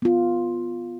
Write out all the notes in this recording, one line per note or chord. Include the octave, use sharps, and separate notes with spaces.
B3 F4